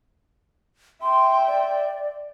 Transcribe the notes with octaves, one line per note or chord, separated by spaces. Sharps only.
E5 G5 C6
D5